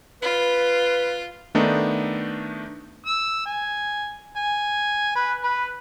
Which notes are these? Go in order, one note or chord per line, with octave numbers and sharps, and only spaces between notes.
F4 B4
D#3 A3 B3 D4 D#4
E6
G#5
G#5
B4
B4